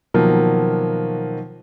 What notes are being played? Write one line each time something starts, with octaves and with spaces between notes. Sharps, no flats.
B2 D#3 F3 F#3 A#3